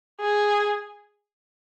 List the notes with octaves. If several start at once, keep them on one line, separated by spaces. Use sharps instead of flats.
G#4